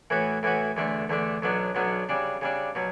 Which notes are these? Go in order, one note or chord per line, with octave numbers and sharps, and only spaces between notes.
A2 E3 B3 F#4
A2 E3 B3 F#4
E2 D3 A3 D4
E2 D3 A3 D4
B1 B2 F#3 B3 D4
B1 B2 F#3 B3 D4
C#3 G3 D4
C#3 G3 D4
B2 F#3